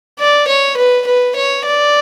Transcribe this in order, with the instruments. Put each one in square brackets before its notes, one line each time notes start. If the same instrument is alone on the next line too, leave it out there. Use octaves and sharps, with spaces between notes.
[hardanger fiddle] D5
C#5
B4
B4
C#5
D5